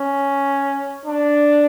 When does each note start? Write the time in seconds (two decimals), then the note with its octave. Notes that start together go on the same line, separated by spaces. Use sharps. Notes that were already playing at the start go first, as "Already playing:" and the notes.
Already playing: C#4
1.05 D4